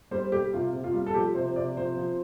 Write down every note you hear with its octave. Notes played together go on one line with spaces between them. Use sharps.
G3 C5
G3 G4
C3 F4
C3
F4
G3
A4
F3 G4
C3 C5
C3 D5
F3 C5
F3